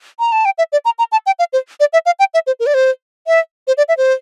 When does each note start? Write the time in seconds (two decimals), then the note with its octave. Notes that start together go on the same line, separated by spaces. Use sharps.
0.19 A#5
0.32 A5
0.45 G5
0.58 E5
0.72 D5
0.85 A#5
0.99 A#5
1.12 A5
1.26 G5
1.39 F5
1.53 C5
1.80 D5
1.93 E5
2.06 F5
2.19 G5
2.34 E5
2.47 C5
2.60 A#4
2.66 D5
2.74 C5
3.27 E5
3.67 C5
3.77 D5
3.89 E5
3.97 C5